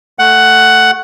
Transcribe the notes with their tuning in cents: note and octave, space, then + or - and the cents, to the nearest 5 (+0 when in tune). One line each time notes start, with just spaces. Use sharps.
A3 +0 F#5 +10